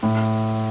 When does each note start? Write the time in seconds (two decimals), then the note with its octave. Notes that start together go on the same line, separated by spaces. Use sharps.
0.03 A2